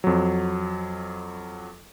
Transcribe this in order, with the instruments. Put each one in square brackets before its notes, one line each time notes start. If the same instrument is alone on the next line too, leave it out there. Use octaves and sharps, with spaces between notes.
[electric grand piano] F2 F#3